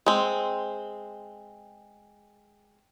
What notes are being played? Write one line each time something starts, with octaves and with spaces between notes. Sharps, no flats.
G#3 C4